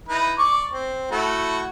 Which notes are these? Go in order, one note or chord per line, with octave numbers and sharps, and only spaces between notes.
D#4 E4 B4
D5 C#6 D6
C4
A3 E4 F#4